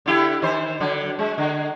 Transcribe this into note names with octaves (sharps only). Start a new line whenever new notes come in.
D3 E4 G4
D#3 C5
D3 F#3
G#3
D3